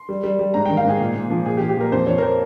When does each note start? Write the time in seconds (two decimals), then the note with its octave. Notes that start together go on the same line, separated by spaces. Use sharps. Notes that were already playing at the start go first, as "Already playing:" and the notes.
Already playing: C6
0.09 G3
0.23 G3
0.39 G3
0.54 G#2 A#5
0.66 D#3 G5
0.77 F5
0.85 G#2 G#4
1.00 A#2
1.16 A#2
1.30 F3
1.46 A#2 G#4
1.57 G4
1.61 F3
1.69 G4
1.77 A#2 A#4
1.92 F2 C5
2.07 F2 C#5
2.18 A#4
2.22 C5